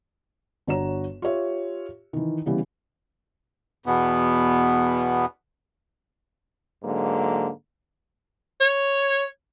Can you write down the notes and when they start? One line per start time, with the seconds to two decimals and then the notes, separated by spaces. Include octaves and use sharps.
0.67 G1 D4 F#4 C#5 A#5 E7
1.22 F4 G4 C#5 E5
2.13 D#3 E3
2.46 C#3 E3 G3 B3
3.86 E2 B2 B3
6.84 G#2 D3 F#3 A#3
8.61 C#5